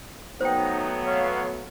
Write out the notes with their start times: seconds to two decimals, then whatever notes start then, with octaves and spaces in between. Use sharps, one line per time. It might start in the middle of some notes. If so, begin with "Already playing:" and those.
0.41 F#3 A3 B3 D#4 C5 G5
1.07 C#5 F5